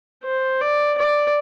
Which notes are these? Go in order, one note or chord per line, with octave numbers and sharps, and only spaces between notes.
C5
D5
D5